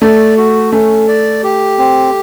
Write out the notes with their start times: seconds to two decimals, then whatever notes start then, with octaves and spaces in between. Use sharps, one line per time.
0.01 A3 D5
0.37 F#4
0.72 A3 C#4
1.08 D5
1.43 G4
1.79 C4